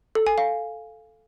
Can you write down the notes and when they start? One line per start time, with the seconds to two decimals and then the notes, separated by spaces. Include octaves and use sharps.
0.15 A4
0.27 G#5
0.38 F5